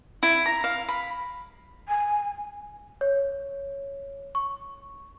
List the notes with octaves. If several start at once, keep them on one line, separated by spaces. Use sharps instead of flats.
E4
A#5
F5
B5
G#5
C#5
C#6